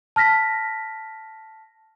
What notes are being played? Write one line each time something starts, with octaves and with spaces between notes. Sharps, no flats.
A5 F6 A#6 B6